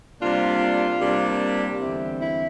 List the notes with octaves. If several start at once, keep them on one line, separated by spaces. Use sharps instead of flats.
C3 G3 A#3 D4 F4
C3 G3 A#3 D4
E2 D3 G3 C4 E4
E4